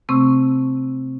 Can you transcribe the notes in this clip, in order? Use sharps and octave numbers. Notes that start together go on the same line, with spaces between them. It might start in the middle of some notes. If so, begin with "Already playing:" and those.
C3 A3 C4 C#6 E6